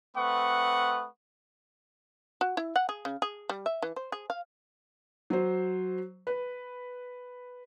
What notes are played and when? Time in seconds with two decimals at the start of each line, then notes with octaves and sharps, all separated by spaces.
0.17 A3 C4 B4 F#5 C#6 D#6
2.41 F#4
2.57 E4
2.76 F#5
2.89 G#4
3.05 C#3
3.22 G#4
3.49 G3
3.66 E5
3.82 E3
3.96 C5
4.12 G#4
4.30 F5
5.30 F#3 C5
6.27 B4